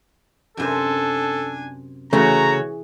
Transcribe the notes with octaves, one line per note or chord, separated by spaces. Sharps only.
F#2 C3 D4 A4 C5 G#5
C#3 E3 A3 F#4 G#4 C#5 A#5